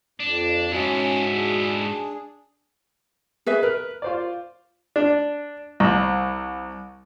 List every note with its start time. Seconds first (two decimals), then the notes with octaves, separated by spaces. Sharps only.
0.20 F2 D4
0.72 G#2 C#4 E4 F#4 A5
1.33 D4 G#4
3.46 G#4 B4 E5
3.63 A#4 B4
4.02 F4 C5 D5
4.96 D4
5.80 C2